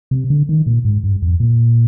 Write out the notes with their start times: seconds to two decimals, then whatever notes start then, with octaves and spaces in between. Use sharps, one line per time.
0.11 C3
0.30 D3
0.49 D#3
0.66 A#2
0.85 G#2
1.04 G2
1.22 F2
1.40 A#2